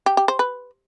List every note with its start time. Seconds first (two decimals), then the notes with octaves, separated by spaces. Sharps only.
0.06 G4
0.17 G4
0.28 C5
0.39 B4